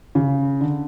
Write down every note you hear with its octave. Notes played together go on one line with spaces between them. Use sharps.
C#3
D3